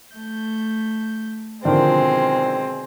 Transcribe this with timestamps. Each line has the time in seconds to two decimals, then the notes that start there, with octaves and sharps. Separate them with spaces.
0.15 A3 G6
1.65 B2 D3 D#3 F3 G#3 C4